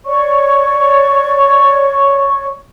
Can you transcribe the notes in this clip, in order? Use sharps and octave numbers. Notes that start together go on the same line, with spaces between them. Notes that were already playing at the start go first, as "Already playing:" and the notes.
C#5 D5 C#6